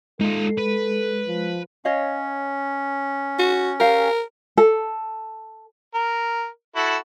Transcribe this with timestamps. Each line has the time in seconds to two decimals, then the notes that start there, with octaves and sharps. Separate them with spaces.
0.21 G#3 D#4 F4 A4
0.58 B4
1.27 F3
1.85 C#4 C#5 D#5 F5
3.39 F#4
3.80 G4 A#4 F5 G#5
4.58 A4
5.94 A#4
6.76 E4 F#4 A4